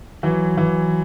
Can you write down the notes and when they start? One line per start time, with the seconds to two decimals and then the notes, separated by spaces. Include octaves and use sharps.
0.23 E3 F#3
0.57 E3